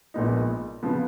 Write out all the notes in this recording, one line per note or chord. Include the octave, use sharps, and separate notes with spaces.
A#1 A#2 G#3 B3 D#4
C#3 F3 B3